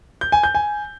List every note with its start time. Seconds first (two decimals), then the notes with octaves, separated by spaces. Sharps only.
0.21 G6
0.32 G#5
0.43 G6
0.55 G#5